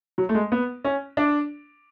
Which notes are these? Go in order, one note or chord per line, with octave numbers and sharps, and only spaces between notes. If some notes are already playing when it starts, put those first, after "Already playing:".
F#3
A3
G#3
B3
C#4
D4